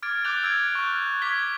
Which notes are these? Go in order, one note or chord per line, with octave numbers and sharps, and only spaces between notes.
D6 F6 G#6 A6 D7
D6 F#6 G6 A6 F7 G7
E6 G#6 D7
C#6 F6 F#6
D6 G#6 B6 G7